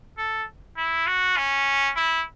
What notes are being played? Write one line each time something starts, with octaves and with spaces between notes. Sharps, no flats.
A4
E4
F#4
C#4
E4